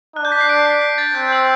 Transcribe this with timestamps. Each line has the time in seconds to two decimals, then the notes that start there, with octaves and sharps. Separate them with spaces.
0.16 D4 F#6
0.25 G6
0.32 B6
0.41 C7
0.49 D7
0.66 C7
0.81 B6
0.98 A6
1.15 C4 G6
1.32 E6